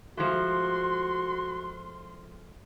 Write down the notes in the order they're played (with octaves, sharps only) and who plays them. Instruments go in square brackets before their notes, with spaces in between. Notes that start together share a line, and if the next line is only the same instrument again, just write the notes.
[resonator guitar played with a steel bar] F3 G#3 A3 [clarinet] F#4 [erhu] C6